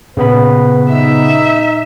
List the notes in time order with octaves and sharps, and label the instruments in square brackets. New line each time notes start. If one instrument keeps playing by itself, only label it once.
[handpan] A#2 [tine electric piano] C#3 B3 B5 [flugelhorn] B4
[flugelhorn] D#4 [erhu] E5